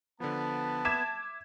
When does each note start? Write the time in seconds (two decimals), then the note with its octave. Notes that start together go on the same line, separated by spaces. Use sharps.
0.20 D3 F3 B3 A5
0.85 E5 D6 G#6 B6 E7